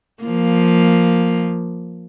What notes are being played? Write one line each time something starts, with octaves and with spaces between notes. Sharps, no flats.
F3 A#3